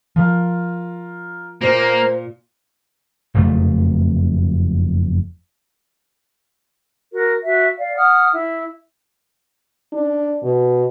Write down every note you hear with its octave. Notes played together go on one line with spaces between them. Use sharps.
F3 F4 A#4 F5
A#2 A#3 C5
F#1 F2 A3
F#4 A#4
F#4 E5
D5 F5
F#5 D#6 F6
E4
D4
B2